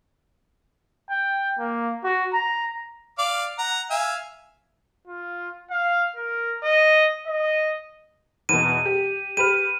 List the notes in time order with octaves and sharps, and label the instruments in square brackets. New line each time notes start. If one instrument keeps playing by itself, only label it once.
[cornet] G5
A#3
F#4
A#5
[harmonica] D5 F5 D6
F#5 A#5
E5 F5 G#5
[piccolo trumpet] F4
F5
A#4
D#5
D#5
[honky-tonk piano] E2 B2 [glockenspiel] D#7
[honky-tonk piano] G4
[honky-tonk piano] G4 B4 F6 [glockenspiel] D#7